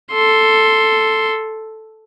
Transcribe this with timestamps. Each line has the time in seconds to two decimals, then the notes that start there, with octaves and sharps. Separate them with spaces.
0.12 A4 C6